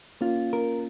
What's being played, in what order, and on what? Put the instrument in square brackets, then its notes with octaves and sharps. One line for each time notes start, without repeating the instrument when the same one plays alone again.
[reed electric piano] A#3 C#4 [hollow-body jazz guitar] F4
[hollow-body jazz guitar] A#4